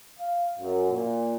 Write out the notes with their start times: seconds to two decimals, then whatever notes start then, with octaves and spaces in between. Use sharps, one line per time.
0.19 F5
0.59 F#2
0.91 A#2